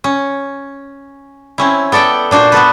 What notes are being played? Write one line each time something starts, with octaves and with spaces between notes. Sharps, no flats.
C#4
C4 C#4 E4
B3 A4 D5 F#5 G5
A#2 D4 F#4 C5
B3 F#4 A4 B4